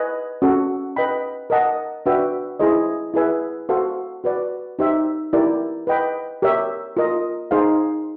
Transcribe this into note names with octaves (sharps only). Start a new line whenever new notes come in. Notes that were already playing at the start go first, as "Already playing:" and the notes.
Already playing: B4 D#5 G#5 C#6
C#4 F#4 A4
B4 D#5 G5 B5
A#4 D#5 F#5 A5
D4 F#4 B4 E5 G5
E4 G#4 C5 D#5
E4 G#4 B4 E5 G#5
F#4 A4 C5 F5
F#4 B4 D5
D#4 G4 C5 E5
E4 G4 A#4 D5
B4 D#5 G5 B5
G4 A#4 C#5 E5
F4 A#4 D#5
D#4 G#4 C5 F5